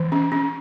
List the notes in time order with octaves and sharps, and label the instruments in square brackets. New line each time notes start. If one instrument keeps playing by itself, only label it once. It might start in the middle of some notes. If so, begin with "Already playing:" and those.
Already playing: [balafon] E3
C#4
C#4